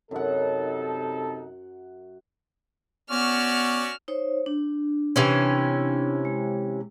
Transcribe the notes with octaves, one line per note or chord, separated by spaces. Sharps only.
F#2 C3 D#4 A4 F#5
B3 C#4 F#4 D5 F6 E7
D#4 C5 C#5
D4
C3 E3 C#4
G#3